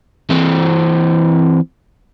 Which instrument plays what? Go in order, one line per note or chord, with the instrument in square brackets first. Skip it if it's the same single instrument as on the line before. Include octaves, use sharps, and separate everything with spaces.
[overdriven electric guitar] E3 C4